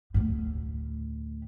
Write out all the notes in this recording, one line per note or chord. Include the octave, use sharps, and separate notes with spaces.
D2 A2